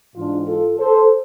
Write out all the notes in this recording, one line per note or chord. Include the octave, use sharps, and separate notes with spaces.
G#2 E3 D4 F4
F4 A4
A4 C5